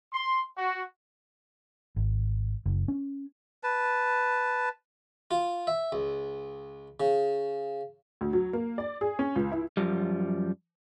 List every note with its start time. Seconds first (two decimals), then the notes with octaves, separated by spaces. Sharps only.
0.13 C6
0.57 F#4
1.96 G#1
2.66 F#1
2.88 C#4
3.63 B4 A5
5.31 F4
5.67 E5
5.92 C#2
7.00 C#3
8.21 D2
8.33 F#3
8.53 A#3
8.78 D5
9.01 G#4
9.19 C#4
9.36 C#2
9.52 E4
9.77 F#2 F3 G3